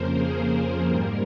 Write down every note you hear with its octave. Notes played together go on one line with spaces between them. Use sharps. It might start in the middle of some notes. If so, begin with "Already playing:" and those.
Already playing: F2 C#3 F3 A#3 A#4 C5
G#4
A#4
G#2 G3 A#3 A#4